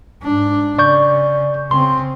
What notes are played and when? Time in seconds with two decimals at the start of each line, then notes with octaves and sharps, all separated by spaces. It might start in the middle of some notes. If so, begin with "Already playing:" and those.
0.22 G#2 D4
0.78 C#3 D5 C#6 G6
1.71 C#3 C4 C6